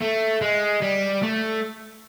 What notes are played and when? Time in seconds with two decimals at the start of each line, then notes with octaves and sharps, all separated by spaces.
0.01 A3
0.42 G#3
0.82 G3
1.23 A3